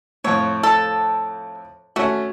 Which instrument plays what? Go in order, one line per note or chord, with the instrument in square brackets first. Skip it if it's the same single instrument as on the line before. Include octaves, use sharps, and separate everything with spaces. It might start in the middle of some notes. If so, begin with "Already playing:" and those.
[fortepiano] F2 A2 [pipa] C#5
[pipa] A4
[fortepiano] A3 C#4 [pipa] F#4